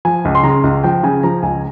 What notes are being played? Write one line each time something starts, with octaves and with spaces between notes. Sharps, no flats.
F3 G#5
C#2
C6
C#3 A#5
C#2
F3 G5
C#3 G#5
F3 A#5
C#2 G#5